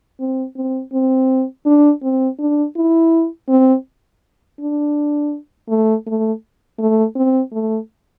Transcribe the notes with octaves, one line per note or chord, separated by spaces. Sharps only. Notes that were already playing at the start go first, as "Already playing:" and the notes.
C4
C4
C4
D4
C4
D4
E4
C4
D4
A3
A3
A3
C4
A3